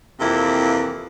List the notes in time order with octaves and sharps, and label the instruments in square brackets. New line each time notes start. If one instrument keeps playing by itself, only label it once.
[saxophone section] F2 C3 E3 A#3 E4